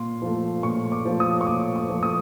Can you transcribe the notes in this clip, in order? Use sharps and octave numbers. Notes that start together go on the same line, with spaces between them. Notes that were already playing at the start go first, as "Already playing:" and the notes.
Already playing: A#2 C6
F3 A3
A#2 C#6
D6
F3
A3
D#6
C#6
A#2 D6
C#6
F3 A3
D#6